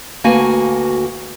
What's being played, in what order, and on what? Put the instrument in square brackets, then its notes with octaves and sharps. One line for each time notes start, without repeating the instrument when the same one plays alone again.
[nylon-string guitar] D2 A#3 F#4 B4 G#5